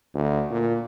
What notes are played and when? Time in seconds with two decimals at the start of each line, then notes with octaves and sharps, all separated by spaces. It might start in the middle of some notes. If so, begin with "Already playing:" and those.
0.14 D2
0.51 A#2